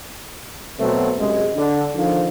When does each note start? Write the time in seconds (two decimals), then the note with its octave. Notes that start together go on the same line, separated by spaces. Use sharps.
0.80 B2 F#3 A3 C4
1.18 F#2 C3 G#3
1.56 D3
1.95 D3 D#3 F3